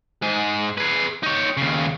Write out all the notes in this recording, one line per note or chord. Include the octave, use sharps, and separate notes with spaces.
G#2 G#4
G#4 B4
D#4 C#5
D#2 C#3